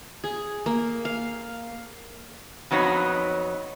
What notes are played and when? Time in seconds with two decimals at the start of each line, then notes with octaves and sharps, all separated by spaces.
0.24 G#4
0.66 A#3
1.05 F5
2.71 F2 F#3 B3 D#4